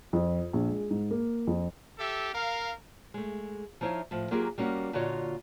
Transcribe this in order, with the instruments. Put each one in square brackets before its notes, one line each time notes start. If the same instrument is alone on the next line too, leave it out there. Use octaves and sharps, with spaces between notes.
[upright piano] F2
A#1
G#3
G#2
A#3
F2
[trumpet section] G4 A4 E5
A#4 F5
[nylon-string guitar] G#3 A3
F3 D#4 E4 C#5 F5
A2 F3
F#3 A#3 F4 G4 G#4 A#4
G3 A#3 C#4 F#4
A#2 D3 F4 F#4 C#5 D#5